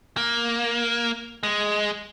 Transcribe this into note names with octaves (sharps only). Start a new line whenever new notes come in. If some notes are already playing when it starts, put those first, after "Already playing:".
A#3
G#3